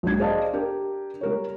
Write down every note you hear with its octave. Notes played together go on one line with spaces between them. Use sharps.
B1 G#2 D4 G#6
G#4 C5 D5 D#5 F5 A5
D4 G4 A#4
G3 A#4 C#5